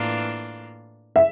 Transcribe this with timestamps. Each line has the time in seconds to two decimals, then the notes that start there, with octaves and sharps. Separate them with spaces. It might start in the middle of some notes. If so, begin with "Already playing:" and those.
Already playing: A2 E3 A#3 D4 F4
1.16 E5